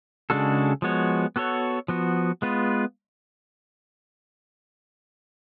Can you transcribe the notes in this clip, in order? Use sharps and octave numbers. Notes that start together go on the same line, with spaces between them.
C#3 G#3 D4 F#4 A4
F3 G#3 B3 F#4 C#5
B3 F#4 A4 C#5
F3 B3 F#4
G#3 B3 F4 B4